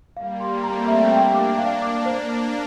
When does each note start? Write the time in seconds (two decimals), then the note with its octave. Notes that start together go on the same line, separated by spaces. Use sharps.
0.16 G3 A#3 F5
0.40 C6
0.63 A3 C4 A#5
0.88 E5
1.11 A#3 D4 G5
1.35 D6
1.58 F5
1.82 D6
2.05 A#3 D4 C5
2.29 D6